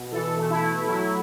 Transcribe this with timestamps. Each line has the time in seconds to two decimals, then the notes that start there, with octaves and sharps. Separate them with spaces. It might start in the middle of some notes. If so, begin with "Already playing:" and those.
Already playing: B2
0.12 E3 A4
0.37 A3
0.50 E4
0.62 A3
0.87 F#3 E4